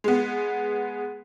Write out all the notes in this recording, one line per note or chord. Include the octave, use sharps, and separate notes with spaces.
G#3 B3